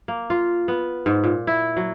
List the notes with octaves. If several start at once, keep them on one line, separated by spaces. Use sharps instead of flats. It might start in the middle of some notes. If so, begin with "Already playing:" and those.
A#3
F4
B3
G#2
A#2
E4
F#3